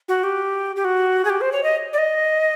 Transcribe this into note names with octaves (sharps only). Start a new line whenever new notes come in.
F#4
G4
G4
F#4
G#4
G4
C5
C#5
D#5
D5
D#5